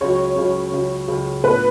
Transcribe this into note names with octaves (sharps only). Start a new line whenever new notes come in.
C#2 C#3 F#3 C#5
C#2 C#3 F#3
C#2 C#3 F#3
C#2 C#3 F#3
A2 F3 B3 D4 B4